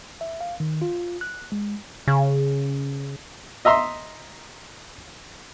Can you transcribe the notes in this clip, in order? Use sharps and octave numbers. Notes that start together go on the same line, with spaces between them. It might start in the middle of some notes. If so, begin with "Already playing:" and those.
E5
F5
D#3
F4
F#6
G#3
C#3
D#5 E5 A#5 C6